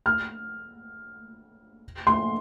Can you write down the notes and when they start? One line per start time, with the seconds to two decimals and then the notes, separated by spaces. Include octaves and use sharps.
0.06 F6
2.07 C6